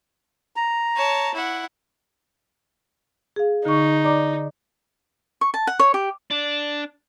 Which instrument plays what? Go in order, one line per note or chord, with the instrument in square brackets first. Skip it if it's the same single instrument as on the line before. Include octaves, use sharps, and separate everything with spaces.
[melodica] A#5
[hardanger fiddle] C#5 A5
E4 F#5
[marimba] G#4 F5
[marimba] D3 C#6 [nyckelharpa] D#4
[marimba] D5 A#5 D6
[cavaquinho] C#6
A5
F#5
C#5
G4
[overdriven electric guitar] D4